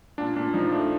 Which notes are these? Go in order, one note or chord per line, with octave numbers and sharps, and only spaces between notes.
A#2 D4
A#2 D4
F3 D#4
A3 D4